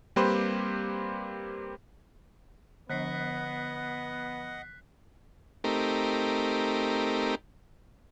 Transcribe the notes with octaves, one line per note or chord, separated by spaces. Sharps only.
G3 A#3 C4 G4 B4 C5
D3 F3 B3 D#5 F#5 F#6 B6 C7
A3 C4 D#4 G4 A#4